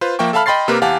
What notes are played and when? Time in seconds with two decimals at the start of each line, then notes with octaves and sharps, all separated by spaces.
0.01 F4 B4 C5
0.19 F3 A#3 E5 G5 C#6
0.33 A4 E5 F5 A5 B5 F6
0.46 D#5 G5 B5 C6 A6 C7
0.68 C3 A#3 G4 A#4 B4
0.82 E2 G4 F5 F#5 G#5 A5